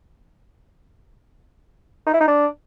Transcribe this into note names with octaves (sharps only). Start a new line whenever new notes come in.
D#4
E4
D#4
D4